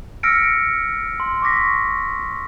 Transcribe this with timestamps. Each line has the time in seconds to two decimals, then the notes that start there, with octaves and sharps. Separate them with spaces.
0.23 E6 F6 A#6 B6 C#7 D7
1.20 C6
1.42 C#6 D6 A#6 B6